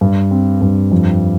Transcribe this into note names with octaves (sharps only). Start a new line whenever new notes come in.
G2
C4
G2
F2